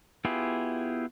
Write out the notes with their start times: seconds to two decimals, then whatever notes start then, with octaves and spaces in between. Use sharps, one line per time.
0.25 B3 E4 F4 G4 G#4